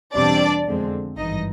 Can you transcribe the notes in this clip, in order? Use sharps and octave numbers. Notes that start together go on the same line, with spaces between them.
E2 B2 G3 C4 D4 D5
F2 D3 F3 G#3 C4
G#1 G2 E3 D#4 D#5